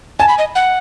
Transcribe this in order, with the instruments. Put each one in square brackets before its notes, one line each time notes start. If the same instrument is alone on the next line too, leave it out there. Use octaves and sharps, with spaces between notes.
[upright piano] G#5 [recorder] A5
[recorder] B5
D#5
F#5